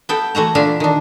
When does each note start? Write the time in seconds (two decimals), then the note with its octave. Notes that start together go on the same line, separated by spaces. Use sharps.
0.09 B3 A4 G5
0.35 E3 A3 F#4 A#5
0.55 A#2 D3 E3 D4 E5 F5
0.80 D#3 D4